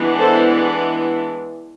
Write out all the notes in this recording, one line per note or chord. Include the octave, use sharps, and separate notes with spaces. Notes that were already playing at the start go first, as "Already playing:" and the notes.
Already playing: E3 G#3 B3 D4
A4 C5